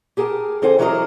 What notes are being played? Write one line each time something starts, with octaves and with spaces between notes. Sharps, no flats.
G4 G#4 A#4 G5 A5
D3 C4 A4 C5 G#5
E3 F#3 D4 A#4 C5 D#5